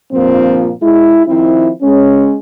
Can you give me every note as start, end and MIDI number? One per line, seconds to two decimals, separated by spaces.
0.12 0.72 43
0.12 0.72 46
0.12 0.72 53
0.12 0.72 58
0.12 0.72 60
0.81 1.21 56
0.81 1.21 64
1.26 1.70 51
1.26 1.70 53
1.26 1.70 60
1.26 1.70 64
1.81 2.36 56
1.81 2.36 61